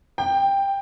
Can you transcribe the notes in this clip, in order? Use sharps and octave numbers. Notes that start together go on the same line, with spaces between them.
G5